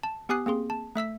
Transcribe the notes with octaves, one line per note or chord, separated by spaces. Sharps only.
A5
B3 G4 G#5 D#6 F#6 C7
A#3 C4 G#4 C6
A5
A3 E5 E6 B6